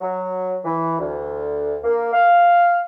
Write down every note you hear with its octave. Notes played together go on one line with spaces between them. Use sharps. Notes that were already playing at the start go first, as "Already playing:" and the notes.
F#3
E3
D2
A#3
F5